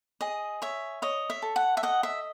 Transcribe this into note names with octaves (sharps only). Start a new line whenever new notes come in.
G#4 D#5
C#5 E5
C#5 D#5
E5
A4
F#5
E5
D#5 F#5
E5